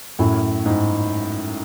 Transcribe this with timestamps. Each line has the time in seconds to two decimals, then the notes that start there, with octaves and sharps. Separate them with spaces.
0.19 F#2 A2
0.66 G#2